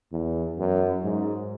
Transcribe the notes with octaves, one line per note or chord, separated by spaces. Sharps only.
E2
F#2
G#2